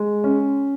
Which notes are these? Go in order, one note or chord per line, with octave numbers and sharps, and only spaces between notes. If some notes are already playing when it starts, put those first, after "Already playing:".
Already playing: G#3
C#4